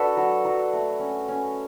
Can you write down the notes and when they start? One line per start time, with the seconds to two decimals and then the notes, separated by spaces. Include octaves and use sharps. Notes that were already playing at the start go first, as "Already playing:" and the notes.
Already playing: D4 F#4 A4 B4
0.17 F#3
0.45 F#3
0.73 A3
1.00 C#4
1.28 C#4